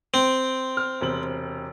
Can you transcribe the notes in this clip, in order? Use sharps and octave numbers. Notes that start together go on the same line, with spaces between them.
C4
F6
E1 C3 F#7